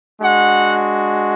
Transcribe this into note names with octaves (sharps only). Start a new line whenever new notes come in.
G#3 D4 F#4 F#5